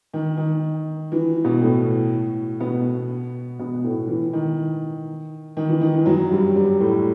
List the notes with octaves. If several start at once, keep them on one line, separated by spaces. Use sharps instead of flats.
D#3
D#3
E3
B2 B3
A2 A3
B2 B3
B2 B3
A2 A3
E3
D#3
D#3
E3
D#3
E3
F#2 F#3
G2 G3
G2 G3
A2 A3